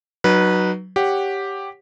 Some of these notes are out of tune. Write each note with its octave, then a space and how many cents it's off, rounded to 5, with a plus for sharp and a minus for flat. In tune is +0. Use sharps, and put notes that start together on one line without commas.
F#3 +10 D#4 -30 B4 -15
G4 +0 C#5 +0 F#5 +0